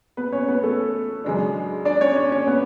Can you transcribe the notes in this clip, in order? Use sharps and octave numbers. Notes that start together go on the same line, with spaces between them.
B3 B4
C#4 C#5
B3 B4
A3 A4
F#2 C#3 G#3 D4
D4 D5
C#4 C#5
C#4 C#5
C#4 C#5
B3 B4